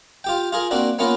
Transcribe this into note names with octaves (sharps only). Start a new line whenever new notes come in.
F4 G4 G5
F4 G#4 A#4
A#3 C4 D4 F#4
A#3 B3 C#4 F4 A#4